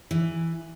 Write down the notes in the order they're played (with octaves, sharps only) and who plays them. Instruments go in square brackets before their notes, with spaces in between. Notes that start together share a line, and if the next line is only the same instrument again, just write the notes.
[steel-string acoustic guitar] E3